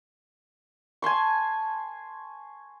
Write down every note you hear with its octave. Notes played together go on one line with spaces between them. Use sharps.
G#5 A5 C6 C#6